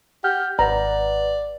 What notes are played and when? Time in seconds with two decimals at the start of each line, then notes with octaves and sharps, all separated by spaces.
0.24 G4 F#5 F6 G6
0.59 G#1 B4 D5 F#5 A#5